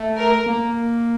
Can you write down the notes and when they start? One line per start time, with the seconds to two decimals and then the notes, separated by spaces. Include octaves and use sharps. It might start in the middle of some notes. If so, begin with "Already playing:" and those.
Already playing: A3
0.17 A#4
0.46 A#3